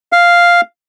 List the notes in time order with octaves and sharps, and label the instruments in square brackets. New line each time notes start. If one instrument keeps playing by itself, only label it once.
[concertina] F5